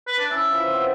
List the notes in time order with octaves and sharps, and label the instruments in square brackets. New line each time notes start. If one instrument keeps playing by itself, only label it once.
[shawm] B4
D4
[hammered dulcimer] C#4 E4 [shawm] E5
[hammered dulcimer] E3 F3 F4
B3 C4 C#5